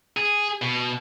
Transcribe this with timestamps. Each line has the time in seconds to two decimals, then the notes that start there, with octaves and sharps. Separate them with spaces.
0.17 G#4
0.62 B2